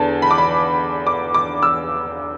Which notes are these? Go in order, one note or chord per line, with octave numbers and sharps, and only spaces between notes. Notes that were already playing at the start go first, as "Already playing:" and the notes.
Already playing: E2 D3 A5
B5
D6
B5
D6
D6
E6